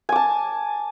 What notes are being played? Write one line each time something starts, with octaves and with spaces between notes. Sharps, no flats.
G#5 A5 D6